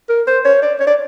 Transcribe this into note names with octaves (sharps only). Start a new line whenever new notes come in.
A#4
C5
C#5
D5
C#5
D5